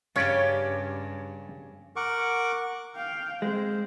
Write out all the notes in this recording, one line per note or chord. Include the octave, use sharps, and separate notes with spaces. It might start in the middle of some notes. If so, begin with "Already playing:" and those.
G2 C#3 C#4 G4 C#5 D5 F#5
A#4 F#5 C#6 D6
F5 G5
G#3 C4 C5